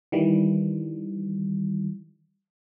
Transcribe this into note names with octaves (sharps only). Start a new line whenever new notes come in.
D#3 E3 G3